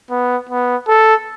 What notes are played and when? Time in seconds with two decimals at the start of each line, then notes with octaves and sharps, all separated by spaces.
0.10 B3
0.49 B3
0.88 A4